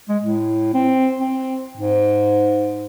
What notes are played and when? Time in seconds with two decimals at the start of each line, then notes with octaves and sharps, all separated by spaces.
0.09 G#3
0.23 A2
0.74 C4
1.20 C4
1.77 G#2